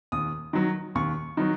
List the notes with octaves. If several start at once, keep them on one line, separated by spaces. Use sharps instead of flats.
D#2 D#6
D#3 F#3
D#2 C#6
D#3 F#3